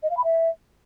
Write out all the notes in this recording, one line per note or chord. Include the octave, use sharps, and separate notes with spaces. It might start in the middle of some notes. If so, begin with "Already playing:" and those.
D#5
F5
B5
E5